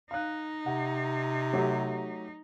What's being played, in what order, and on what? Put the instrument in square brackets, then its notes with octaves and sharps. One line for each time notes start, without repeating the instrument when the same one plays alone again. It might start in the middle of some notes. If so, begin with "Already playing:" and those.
[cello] D#4 [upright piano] F5 F#6
[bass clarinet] C3 [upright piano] F#5
[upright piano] F#3 A3 G4